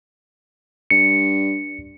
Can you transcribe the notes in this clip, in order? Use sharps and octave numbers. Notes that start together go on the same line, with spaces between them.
G2 C#7